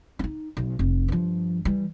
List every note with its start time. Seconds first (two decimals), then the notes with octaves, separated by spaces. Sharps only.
0.19 D4 D#4
0.57 B1
0.79 F1
1.08 G2 F3
1.65 E3 G3